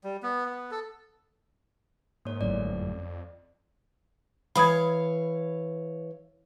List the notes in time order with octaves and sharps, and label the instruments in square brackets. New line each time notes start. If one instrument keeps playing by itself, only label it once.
[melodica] G3
B3
B3
A4
[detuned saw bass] G#2 [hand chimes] A#3 C#5
[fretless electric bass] G1 F#2 A2 [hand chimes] D5
[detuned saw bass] F2
[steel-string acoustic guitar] E3 C#5 F5 [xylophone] B5 D#6 G#6